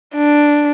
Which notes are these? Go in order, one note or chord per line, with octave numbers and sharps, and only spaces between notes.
D4